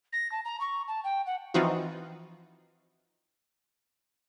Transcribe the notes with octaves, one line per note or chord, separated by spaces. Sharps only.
A#6
A5
A#5
C#6
A5
G5
F#5
E3 F3 C4 D#4 F4 F#4